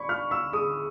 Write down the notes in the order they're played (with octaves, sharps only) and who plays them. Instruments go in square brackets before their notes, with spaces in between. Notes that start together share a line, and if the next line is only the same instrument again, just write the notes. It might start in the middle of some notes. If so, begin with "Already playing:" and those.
Already playing: [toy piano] D5 [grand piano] B5 C#6
[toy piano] F5 [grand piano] F6
[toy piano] F5 [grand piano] E6
[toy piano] G#4 [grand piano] D#6